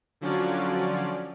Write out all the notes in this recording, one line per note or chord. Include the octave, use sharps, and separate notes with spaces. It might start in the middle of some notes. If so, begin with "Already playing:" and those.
D3 F3 F#3 C#4 F4 D5